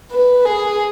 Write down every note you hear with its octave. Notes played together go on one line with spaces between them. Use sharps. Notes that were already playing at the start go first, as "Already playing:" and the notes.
B4
G#4